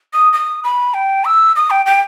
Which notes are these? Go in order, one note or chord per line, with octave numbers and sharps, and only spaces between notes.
D#6
D#6
B5
G5
E6
D#6
G5
G5